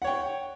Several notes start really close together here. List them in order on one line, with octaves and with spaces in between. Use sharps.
F#5 C#5 G5